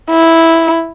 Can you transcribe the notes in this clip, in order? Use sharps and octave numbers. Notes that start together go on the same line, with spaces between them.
E4